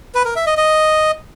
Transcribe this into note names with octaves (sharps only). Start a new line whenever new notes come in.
B4
A#4
E5
D#5
D#5